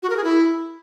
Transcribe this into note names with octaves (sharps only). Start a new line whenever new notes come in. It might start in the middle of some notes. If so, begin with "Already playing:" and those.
F#4
A#4
G#4
E4